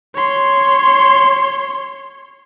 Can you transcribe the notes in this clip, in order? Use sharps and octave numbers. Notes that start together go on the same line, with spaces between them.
C#5 C6